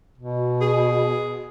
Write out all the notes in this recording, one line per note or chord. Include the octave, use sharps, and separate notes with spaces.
B2
G#4